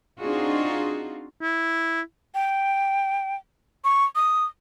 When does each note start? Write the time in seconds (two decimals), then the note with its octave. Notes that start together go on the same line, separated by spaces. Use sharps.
0.19 C4 D4 D#4 F4 F#4 G#4
1.41 E4
2.35 G5
3.84 C#6
4.15 D#6